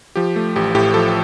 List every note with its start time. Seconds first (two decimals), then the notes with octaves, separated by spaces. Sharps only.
0.16 F3 G4
0.36 A3
0.56 A1 G4
0.75 A2 G4
0.94 F3 A4